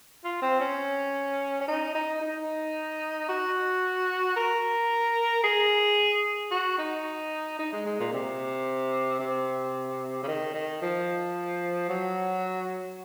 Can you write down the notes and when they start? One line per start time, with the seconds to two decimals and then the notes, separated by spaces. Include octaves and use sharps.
0.24 F4
0.42 C4
0.60 C#4
1.61 C#4
1.68 D#4
1.95 D#4
2.21 D#4
3.29 F#4
4.36 A#4
5.44 G#4
6.51 F#4
6.78 D#4
7.59 D#4
7.73 G#3
7.85 G#3
8.00 A#2
8.13 C3
9.20 C3
10.23 C#3
10.28 D#3
10.54 D#3
10.82 F3
11.89 F#3